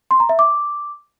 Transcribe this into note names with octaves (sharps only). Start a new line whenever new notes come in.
C6
A#5
E5
D6